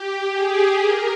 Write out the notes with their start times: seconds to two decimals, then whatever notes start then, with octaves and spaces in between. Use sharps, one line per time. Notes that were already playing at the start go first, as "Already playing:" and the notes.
Already playing: G4
0.30 G#4
0.80 A#4